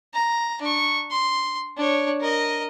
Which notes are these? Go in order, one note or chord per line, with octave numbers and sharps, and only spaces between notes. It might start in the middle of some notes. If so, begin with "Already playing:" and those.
A#5
D4 C#6
C6
D4 C#5
A#4 D#5